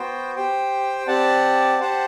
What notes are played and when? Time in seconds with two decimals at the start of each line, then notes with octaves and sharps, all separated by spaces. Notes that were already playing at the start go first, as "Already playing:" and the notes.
Already playing: B3 F#4 C5 G5
0.35 G4 C5 G5
1.07 C4 G4 D5 F#5 A5
1.79 G4 C5 F#5 A5